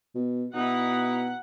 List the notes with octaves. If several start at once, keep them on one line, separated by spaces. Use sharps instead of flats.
B2
B2 D#4 E4 F#5